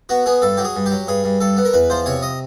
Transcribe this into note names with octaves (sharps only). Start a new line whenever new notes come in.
B3 F#4
B3 G#4
G2 A4
F#3 G4
G#4
G2
F#3 G4
G2 G#4
G2
G2 A4
B3
A#4
E2 B4
F3 C5
C3 C#5
D#5